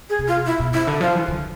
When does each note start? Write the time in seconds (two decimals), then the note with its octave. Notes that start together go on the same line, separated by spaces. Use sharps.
0.10 G#4
0.19 C3
0.28 F4
0.46 B2 E4
0.60 B2
0.74 C3 E4
0.87 D3
1.01 F3 F4
1.15 E3
1.28 D3